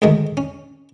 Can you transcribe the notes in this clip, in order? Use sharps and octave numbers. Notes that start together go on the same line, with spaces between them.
D2 G#2 D#3 G#3 A3
C#4